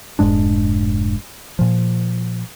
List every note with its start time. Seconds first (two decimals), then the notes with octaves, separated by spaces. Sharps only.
0.19 F1 G#2 G#3 D4
1.59 A#2 F3